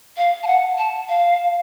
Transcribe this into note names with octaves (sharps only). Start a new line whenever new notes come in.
F5
A5
F#5
A5
F5